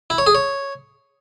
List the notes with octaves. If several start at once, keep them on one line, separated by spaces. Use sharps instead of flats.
E4
C#5
G#4
C#5